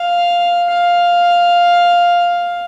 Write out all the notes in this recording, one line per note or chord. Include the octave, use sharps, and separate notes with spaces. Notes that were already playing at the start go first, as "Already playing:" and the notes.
Already playing: F5
F5